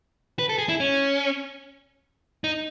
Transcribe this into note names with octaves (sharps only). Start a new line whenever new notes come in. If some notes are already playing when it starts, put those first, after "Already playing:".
B4
A4
G#4
E4
C#4
D#4